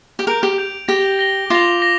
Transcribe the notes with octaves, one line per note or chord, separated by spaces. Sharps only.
G4
A#4 G6 D7 F7
G4
G6 D7 F7
G4 A#6 G7
A#6 G7
F4 D6 A#6 F7
D6 A#6